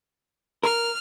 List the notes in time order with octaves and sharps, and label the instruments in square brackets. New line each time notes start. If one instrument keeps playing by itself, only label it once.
[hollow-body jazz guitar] A#4 [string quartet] F6